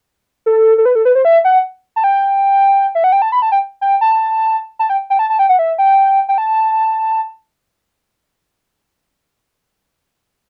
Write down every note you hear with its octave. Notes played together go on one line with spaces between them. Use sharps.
A4
A4
B4
A4
B4
C5
E5
F#5
A5
G5
E5
F#5
G5
A5
B5
A5
G5
G5
A5
A5
G5
G5
A5
A5
G5
F#5
E5
G5
G5
A5